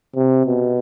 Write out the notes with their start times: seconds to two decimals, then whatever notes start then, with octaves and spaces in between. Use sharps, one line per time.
0.16 C3
0.46 B2